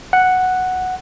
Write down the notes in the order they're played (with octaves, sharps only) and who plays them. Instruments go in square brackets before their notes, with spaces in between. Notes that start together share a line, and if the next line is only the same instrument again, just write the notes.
[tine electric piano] F#5